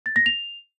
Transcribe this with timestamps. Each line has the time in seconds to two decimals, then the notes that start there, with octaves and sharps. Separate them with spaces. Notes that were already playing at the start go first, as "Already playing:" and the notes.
0.06 A6
0.16 A#6
0.26 F7